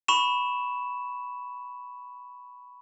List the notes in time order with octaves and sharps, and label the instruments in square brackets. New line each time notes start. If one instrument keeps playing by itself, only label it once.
[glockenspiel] B5 C#6 E7